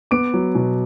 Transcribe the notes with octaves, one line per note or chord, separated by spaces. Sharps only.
B3 D6 D7
F#3
B2